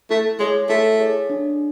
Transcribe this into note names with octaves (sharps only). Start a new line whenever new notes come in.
A3 E4
G#3 G#4 C#5
A3 E4
G#4 C#5
D4